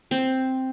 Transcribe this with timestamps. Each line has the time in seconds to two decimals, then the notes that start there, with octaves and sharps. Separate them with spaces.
0.11 C4